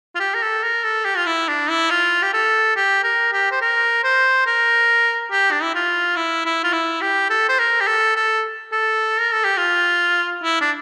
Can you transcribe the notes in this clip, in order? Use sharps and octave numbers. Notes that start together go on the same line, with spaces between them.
F4
G4
A#4
A4
A#4
A4
G4
F4
E4
D4
E4
F4
G4
A4
G4
A#4
G4
C5
A#4
C5
A#4
G4
D4
E4
F4
E4
E4
F4
E4
G4
A4
C5
A#4
G4
A4
A4
A4
A#4
A4
G4
F4
E4
D4